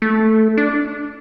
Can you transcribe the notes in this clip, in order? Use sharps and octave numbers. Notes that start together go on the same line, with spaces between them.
A3
D4